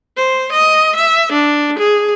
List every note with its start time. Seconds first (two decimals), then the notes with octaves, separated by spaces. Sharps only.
0.17 C5
0.52 D#5
0.96 E5
1.32 D4
1.79 G#4